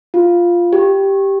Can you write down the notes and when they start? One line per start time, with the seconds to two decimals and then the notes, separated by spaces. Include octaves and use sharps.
0.14 F4
0.73 G4